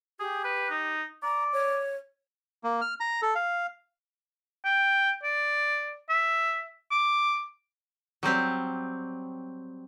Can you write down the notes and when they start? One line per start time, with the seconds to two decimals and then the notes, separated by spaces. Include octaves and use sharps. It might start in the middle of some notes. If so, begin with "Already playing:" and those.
0.20 G4 G#4
0.44 B4
0.70 D#4
1.23 D5 A#5
1.53 C#5
2.64 A#3
2.81 F6
3.00 A#5
3.22 A4
3.35 F5
4.65 G5
5.23 D5
6.09 E5
6.91 D6
8.23 F#3 G3 C4 G4